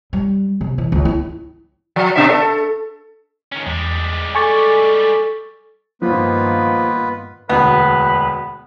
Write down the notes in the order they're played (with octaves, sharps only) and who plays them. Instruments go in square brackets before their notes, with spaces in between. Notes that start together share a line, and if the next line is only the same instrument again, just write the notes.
[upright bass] G3
C3
E3
C#2
E4
[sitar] F3
B2 D4 E5
A4
[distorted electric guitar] D#3 C#4
[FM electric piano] E2 [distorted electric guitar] G3 G#3
[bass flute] A4 [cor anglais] D5 [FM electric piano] G#5 C#6 A6
[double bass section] G2 D#3 [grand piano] F3 [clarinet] A#3 [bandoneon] B3 F4 B4
[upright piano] E1 D2 [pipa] B3 [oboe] B4